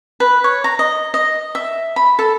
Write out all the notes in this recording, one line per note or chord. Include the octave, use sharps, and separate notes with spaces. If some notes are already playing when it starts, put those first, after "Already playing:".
B4
C#5
A#5
D#5
D#5
E5
B5
A4